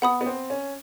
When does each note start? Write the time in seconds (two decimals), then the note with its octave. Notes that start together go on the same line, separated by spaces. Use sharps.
0.02 B3 F#5 B5 D#6
0.21 B3
0.26 C4
0.50 C#4